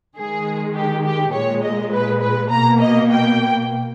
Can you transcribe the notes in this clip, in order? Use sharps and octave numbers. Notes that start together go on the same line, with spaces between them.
D#3 G#3 G#4
G4
G4
A#2 G#3 C#5
D#5
B4
B4
B2 A#3 A#5
D#5
G5